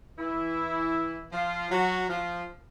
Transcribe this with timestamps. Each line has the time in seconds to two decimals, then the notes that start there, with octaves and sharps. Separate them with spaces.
0.18 E3 E4
1.33 F3 F4
1.71 F#3 F#4
2.09 F3 F4